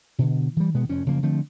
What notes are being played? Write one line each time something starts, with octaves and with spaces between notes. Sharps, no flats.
B2 D3
E3 G3
B2 D#3 G#3 B3
F1 F2 C#4
F#1 C#3 F3 A#3
D3 F3 A3 C4